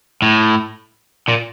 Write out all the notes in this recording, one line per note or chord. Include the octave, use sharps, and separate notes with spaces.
A2
A#2